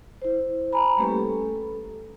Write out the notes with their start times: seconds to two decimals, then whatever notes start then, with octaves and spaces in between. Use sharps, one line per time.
0.22 E4 C5
0.73 G#5 A#5 B5
0.97 G3 A3 A#3 C#4 G4 B4
1.10 A4